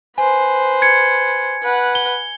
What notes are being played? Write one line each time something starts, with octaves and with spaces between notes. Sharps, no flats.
B4 C5 G#5
G#6 C#7
B4 F#5
G7